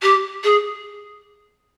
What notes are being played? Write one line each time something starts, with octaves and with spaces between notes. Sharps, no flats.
G4
G#4